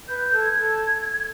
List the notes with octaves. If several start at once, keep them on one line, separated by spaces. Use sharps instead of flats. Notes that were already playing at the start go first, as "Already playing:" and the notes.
B4 G6
G6
A4
G#6
A4